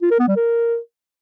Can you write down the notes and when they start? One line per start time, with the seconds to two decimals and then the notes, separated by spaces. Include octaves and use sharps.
0.02 F4
0.11 A#4
0.19 B3
0.28 G3
0.36 A#4